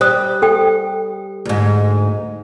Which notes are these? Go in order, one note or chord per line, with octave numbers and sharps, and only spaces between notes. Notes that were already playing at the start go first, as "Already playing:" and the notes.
G3 C5 D#6
A4 G5
D2 G#2